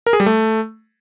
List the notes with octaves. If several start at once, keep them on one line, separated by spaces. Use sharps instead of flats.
A#4
G#4
G3
A3